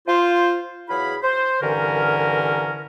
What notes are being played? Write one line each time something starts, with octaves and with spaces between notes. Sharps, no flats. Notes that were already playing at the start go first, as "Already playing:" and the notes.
F4 C5
E2 F#3 E4 G#4 F5 B5
C5
C2 G2 D3 E3 C#4 A#4